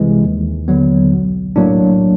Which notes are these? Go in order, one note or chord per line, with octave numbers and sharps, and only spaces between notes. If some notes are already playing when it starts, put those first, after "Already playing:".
Already playing: C2 C3 E3 G#3
D#2
D3 F#3 B3
B1
A2 F#3 A#3 D4